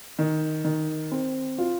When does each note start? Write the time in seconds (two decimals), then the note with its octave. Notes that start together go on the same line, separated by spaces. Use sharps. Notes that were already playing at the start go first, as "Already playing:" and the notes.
0.19 D#3
0.65 D#3
1.12 C4
1.58 F4